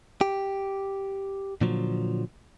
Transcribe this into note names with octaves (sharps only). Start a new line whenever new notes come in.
G4
A#2 D3 F3 F#3